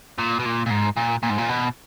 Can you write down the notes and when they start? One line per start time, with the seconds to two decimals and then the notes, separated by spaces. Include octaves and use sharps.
0.18 A#2
0.39 B2
0.45 A#2
0.66 A#2
0.70 G#2
0.97 A#2
1.23 A#2
1.30 G#2
1.38 A#2
1.49 B2